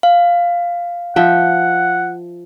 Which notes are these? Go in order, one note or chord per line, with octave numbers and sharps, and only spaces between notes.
F5
F3 E5 F#5 G5